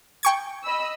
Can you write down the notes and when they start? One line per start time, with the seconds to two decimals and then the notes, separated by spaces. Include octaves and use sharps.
0.23 G5 C#6 G#6
0.64 D#5 B5 E6